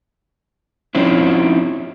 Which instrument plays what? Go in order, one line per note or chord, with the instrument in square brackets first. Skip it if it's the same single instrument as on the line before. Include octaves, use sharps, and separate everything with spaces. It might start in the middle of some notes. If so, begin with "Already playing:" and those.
[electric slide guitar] F3 C4 C#4 D#4 E4